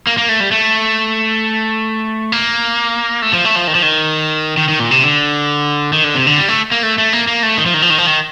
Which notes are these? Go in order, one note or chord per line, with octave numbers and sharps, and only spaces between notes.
A#3
A#3
A3
G3
A3
A#3
A3
F3
A3
F3
D#3
F3
D#3
D#3
D#3
A#2
C3
D3
D#3
D3
C3
D3
G3
A3
A#3
A3
A3
A#3
A#3
A3
D#3
F3
D#3
F3
D#3
F3
D#3